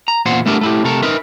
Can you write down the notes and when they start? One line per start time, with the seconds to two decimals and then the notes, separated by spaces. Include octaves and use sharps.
0.08 A#5
0.26 E2 A#2 E4 C5 F#5
0.46 A3 B3 D4 E4 G4 A#4
0.61 A3 E4 G4
0.84 C3 A3 A4 A#4
1.03 D#4 A#4 B4 E5